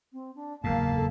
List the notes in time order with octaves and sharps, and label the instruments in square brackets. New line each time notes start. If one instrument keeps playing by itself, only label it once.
[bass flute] C4
D4
[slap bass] F#1 E2 G#2 [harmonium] A#3 A5 [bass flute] F5
[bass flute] A4